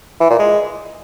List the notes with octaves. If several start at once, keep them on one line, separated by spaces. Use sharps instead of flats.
E3
A#2
G#3